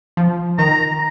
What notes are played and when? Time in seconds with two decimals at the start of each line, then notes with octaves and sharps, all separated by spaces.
0.17 F3
0.59 D#3 A#5